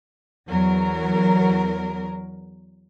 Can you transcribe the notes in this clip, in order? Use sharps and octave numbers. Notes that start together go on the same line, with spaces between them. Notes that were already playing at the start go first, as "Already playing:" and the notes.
E2 F#3 A#4